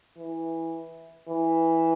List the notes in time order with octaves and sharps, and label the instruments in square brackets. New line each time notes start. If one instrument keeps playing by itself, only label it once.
[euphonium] E3
E3